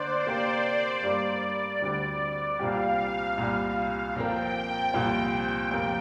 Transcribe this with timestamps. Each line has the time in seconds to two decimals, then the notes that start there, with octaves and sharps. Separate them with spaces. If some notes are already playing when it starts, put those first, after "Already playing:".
Already playing: D3 A#3 D4 C5 D5
0.24 C3 A#3 G4 D5
1.02 G2 G3 A#3
1.81 D2 D3 G3 C4
2.59 C2 A#2 G3 C4 G4 F5
3.37 C2 A#2 G3
4.15 A#2 F3 C4 A#4 G5
4.93 C2 A#2 F3
5.71 F2 C3 A#3